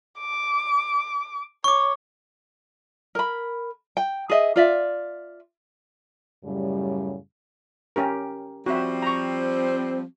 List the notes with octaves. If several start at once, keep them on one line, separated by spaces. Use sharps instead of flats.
D6
C#5 C#6 D6
A#4 B5
G5
G#4 D#5 E5
F4 D5 E5
F#2 A2 C#3 G3
C#4 G4 A#4
F3 G3 C4 F#4 E5
A#5 C#6